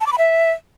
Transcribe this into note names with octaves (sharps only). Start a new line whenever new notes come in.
A5
D6
B5
E5